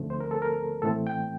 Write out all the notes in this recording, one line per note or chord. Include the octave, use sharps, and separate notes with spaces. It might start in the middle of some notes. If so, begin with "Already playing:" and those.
Already playing: D2 D3 F3 A3 C4
C5
A#4
A4
A#4
A2 E3 A3 C4 A4
G5